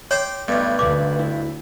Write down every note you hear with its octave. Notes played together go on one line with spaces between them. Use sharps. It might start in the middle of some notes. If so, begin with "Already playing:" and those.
C#5 G5 C6 D6
B1 G2 A3 B3
D2 B4 D6
E4